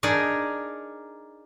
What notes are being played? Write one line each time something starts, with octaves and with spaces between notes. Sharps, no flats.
D4 D#4 G#4 A#4 D5